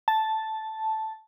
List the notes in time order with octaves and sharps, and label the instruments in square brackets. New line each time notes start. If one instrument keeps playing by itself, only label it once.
[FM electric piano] A5